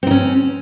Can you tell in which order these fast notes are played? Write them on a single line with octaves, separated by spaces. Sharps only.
C4 D#4 C#4